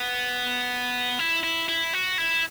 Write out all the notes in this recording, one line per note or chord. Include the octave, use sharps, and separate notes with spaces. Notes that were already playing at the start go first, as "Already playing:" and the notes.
Already playing: B3
E4
E4
E4
F#4
E4